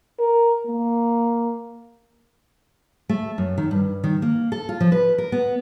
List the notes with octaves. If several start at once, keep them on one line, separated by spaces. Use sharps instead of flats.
A#4
A#3
A3
F#2
D#3
G2
D#3
A#3
A4
F4
F3
B4
A#4
B3